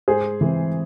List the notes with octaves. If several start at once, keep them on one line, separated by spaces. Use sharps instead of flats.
G#2 G#4 C5
E3 G#3 C4